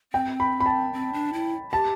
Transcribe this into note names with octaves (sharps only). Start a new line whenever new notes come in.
C4 G5
B5
B5
A5
C4
D4
E4
G4 A5